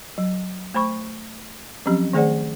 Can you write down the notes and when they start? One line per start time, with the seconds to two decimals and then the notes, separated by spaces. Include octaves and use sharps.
0.18 F#3
0.74 A3 C5 B5 C#6
1.86 F3 F#3 C4 C#4 G4
2.13 D#3 A3 G#4 C5 D5 F#5